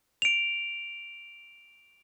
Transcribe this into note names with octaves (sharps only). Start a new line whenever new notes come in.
D7 F7